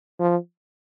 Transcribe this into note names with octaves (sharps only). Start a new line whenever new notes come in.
F3